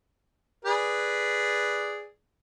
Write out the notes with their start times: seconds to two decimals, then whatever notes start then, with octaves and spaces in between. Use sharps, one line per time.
0.65 G#4 B4 D5